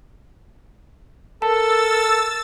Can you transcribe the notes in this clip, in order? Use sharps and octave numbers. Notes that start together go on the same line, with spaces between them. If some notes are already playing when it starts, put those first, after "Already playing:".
A4 A#4 A5 E6 A6